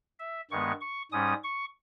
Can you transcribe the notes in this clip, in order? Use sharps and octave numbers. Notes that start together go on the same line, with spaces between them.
E5
G2 D#3 G#3 B3 C#6
C#6
G#2 G3 C#4 D#6
C#6